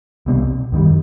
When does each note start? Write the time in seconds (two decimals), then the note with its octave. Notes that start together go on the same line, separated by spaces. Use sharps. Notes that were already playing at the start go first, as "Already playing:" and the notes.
0.26 C2 B2 G3 C4
0.72 F#2 D#3 G3